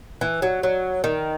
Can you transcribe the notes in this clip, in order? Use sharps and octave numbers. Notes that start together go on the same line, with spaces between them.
E3
F#3
F#3
D#3